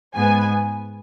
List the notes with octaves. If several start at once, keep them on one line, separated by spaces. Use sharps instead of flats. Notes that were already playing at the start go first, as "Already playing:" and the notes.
G#2 G#3 B3 G#5